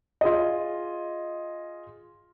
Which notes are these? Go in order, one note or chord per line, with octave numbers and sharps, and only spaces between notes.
F4 G#4 D#5